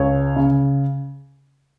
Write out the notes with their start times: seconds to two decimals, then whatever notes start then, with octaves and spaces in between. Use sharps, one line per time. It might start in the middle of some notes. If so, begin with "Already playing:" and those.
Already playing: C#2 C#5
0.36 C#3